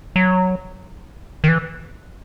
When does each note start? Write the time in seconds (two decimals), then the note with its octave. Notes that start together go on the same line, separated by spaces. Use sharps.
0.16 F#3
1.44 D#3
1.48 E3